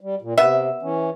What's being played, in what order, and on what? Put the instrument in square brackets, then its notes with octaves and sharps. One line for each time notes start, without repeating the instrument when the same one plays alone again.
[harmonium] G3
A#2
[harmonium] C3 [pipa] B3 E5
[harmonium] E3 C#4